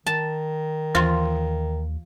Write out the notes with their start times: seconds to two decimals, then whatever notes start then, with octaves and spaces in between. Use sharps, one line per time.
0.06 D#3 A5
0.95 D#2 E3 F4 C6